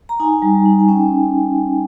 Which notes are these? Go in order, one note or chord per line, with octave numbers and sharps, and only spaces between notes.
A#5
D#4 G#5
G3
D#4
G#5
C#4 G5